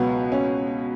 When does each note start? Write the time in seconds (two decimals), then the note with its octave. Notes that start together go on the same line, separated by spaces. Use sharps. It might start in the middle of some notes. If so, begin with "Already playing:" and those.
Already playing: C#2 B2 F#3 B3
0.32 C#4